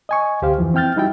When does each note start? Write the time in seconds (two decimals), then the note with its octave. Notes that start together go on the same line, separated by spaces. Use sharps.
0.09 D#5 G#5 C#6
0.42 D2 G4 C5 F5
0.58 F2 E3 F3
0.74 C4 E4 G5 F6 G6 A6
0.96 G3 D#4 E4 F#4 G5